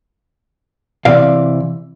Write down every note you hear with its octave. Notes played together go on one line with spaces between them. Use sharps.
C3 E3 D5 F5